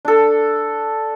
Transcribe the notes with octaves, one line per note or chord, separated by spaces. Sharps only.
D4 A4